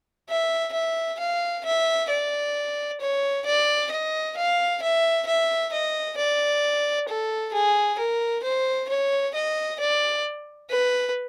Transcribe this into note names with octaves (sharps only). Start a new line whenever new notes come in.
E5
E5
F5
E5
D5
C#5
D5
D#5
F5
E5
E5
D#5
D5
A4
G#4
A#4
C5
C#5
D#5
D5
B4